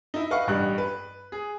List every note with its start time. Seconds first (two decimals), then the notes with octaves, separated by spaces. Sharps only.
0.14 D#4 E4
0.31 B4 D#5 F5 F#5 C#6
0.47 A1 G2 F#6
0.78 B4
1.32 G#4